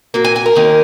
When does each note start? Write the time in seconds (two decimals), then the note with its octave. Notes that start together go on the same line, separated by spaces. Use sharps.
0.14 A#2 F#3 A#3
0.24 G#5
0.36 G#5
0.46 A#4
0.55 D#2 D#3 A#3 C#4